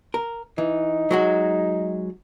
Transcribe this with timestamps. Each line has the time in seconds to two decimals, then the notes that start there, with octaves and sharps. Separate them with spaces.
0.14 A#4
0.58 E3 D#4
1.11 F#3 G#3 F#4